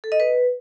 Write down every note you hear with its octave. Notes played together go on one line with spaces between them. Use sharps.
A4
D#5
B4